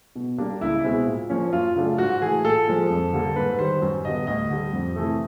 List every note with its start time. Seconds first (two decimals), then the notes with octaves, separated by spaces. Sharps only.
0.16 B2
0.38 G3 A#3 D4
0.61 C#2 E4
0.84 B2 G#3 C4 E4
1.07 A#2
1.30 F3 A#3 C#4
1.53 F#2 F4
1.76 C#3 F#3 A3 D4
1.98 G#2 F#4
2.21 E3 A3 G#4
2.44 A#2 A4
2.68 F3 G#3
2.90 F2
3.13 D3 G3 A#3
3.36 G#2 B4
3.59 D#3 G3 C5
3.82 F#2
4.05 D3 G3 B3 D#5
4.27 D2 D#5
4.50 D3 G3
4.73 F2
4.96 C3 E3 A3